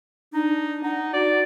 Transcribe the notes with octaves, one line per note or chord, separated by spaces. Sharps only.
D4 D#4
D#4 F#5
F#4 D5